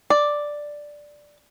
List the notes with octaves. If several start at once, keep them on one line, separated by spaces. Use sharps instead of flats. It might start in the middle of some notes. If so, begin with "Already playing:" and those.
D5